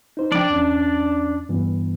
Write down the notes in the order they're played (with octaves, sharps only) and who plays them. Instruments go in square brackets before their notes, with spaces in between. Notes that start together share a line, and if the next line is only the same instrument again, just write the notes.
[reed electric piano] D#4 C5
[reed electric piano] F3 G5 [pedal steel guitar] D4 D5
[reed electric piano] E2 C#4
G2 E3 B3